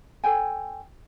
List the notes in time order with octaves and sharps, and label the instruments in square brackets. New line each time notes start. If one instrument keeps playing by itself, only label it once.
[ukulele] A4 C#5 G5 G#5